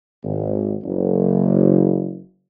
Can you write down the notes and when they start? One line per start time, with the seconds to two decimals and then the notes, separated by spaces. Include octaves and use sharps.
0.24 G#1
0.83 F#1